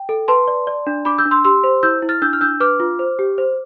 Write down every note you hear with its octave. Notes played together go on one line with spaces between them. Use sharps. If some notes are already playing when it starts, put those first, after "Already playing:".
Already playing: G5
A4
B4 A5 C6
D5
D5
D4
D4 B5 D6
E6 G6
D4
C6 E6
G4 C6 E6
C5
E4 E6 G6
E4
F6 A6
D4 E6 G6
F6
D4 E6 G6
B4 D6 F6
F4
C5
G4
C5